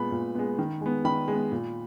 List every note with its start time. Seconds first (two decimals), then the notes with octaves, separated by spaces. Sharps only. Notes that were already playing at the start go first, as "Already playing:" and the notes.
Already playing: A#2 G#3 B3 B5
0.12 A#2
0.35 G#3 B3
0.59 D#3
0.81 G#3 B3
1.05 D#3 B5
1.28 G#3 B3
1.52 A#2